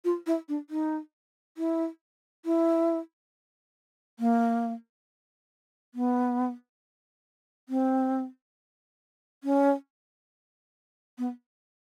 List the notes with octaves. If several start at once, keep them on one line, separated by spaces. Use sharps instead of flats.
F4
E4
D4
D#4
E4
E4
A#3
B3
C4
C#4
B3